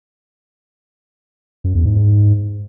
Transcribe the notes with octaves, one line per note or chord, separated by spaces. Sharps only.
F#2
E2
G#2
G#2